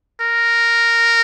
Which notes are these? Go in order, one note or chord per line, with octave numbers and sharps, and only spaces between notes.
A#4